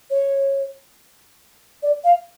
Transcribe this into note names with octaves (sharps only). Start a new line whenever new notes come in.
C#5
D5
F5